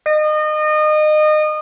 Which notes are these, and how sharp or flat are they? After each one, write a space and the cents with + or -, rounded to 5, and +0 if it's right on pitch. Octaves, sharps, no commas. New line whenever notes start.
D#5 -30